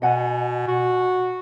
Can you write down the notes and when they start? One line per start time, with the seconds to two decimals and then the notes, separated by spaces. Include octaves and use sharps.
0.02 B2 D#5 F#5 G#5
0.68 F#4